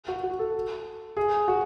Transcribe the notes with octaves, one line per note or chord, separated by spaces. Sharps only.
F#4
F#4
A4
G#4
F#4